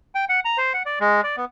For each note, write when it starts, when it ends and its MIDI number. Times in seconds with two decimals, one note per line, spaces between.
0.15 0.25 79
0.29 0.40 78
0.45 0.58 82
0.58 0.73 72
0.74 0.83 78
0.86 0.99 74
1.00 1.21 56
1.24 1.36 74
1.37 1.45 59